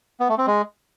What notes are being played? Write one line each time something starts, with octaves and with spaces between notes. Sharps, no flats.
B3
A3
C4
G#3